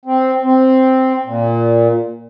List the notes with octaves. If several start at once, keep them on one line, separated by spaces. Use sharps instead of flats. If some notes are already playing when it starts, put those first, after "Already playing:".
C4
C4
A#2